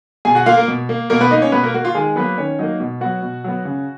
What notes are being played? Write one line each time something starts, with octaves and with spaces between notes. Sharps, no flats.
B2 G#4 G#5
F#4 F#5
A#3 F4 F5
A#3 A#4
B2
A#3
B2 A#3 A#4
B3 B4
A#3 D#4 D#5
C#4 C#5
B2 B3 B4
A#3 A#4
A#3 F#4
F4
D#3 G#3 G#4
F#3 A#3 B3 B4
D#3 C#4 C#5
F#3 A#3 D#4 D#5
B2
F#3 B3 F#4 F#5
B2
F#3 B3
C#3